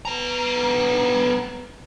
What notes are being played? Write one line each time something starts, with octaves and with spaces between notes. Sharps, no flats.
B3 A#5